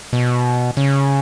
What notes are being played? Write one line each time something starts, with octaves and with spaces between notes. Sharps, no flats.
B2
C#3